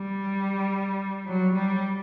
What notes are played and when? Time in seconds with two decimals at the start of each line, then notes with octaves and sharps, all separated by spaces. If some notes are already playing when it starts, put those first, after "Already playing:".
Already playing: G3
1.26 F#3
1.55 G3